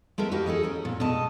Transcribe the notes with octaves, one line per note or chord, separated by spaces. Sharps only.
G#3 A3 B3 A#4 E5
F#4 G4 B4 D#5 F5
G#4 A4 C#5 D#5
C#4 A#4
A#2
B2 G#3 A3 D#5 A5